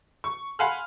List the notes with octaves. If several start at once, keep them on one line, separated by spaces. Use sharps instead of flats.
C#6
F5 F#5 G#5 B5 C6 F6